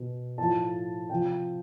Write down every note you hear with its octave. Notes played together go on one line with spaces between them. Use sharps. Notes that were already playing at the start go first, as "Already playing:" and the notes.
Already playing: B2
A2 F3 A5
C3 F3 G5